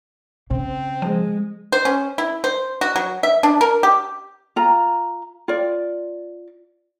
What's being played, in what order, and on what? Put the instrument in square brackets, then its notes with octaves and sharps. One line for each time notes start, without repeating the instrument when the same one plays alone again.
[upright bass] C#3 [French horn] C4
[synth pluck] F3 [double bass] G#3
[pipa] C5
C#4
E4
C5
F#4
F#3
E5
D4
A#4
G4
[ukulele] F4 A#5
F4 D5